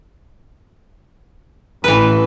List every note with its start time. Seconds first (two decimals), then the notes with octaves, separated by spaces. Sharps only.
1.84 A1 E3 B4